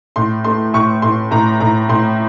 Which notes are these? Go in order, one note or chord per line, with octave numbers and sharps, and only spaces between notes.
A2 C6
A3 C6
A2 C#6
A2 C6
A2 A#5
A2 A#5
A2 C6